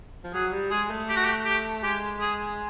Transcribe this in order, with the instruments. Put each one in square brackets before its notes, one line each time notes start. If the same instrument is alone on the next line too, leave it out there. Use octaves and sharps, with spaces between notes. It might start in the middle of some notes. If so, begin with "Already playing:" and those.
[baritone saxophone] F3
[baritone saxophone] F#3 [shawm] G#4
[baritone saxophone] G3
[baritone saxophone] G#3 [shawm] G#4
[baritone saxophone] A3
[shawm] G4
F#4
G4
G4
[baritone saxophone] G#3 [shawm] G4
[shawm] G#4